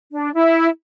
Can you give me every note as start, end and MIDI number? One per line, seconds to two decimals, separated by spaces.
0.12 0.29 62
0.34 0.67 64